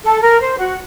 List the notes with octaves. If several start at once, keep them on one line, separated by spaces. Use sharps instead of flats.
A4
A#4
C5
F#4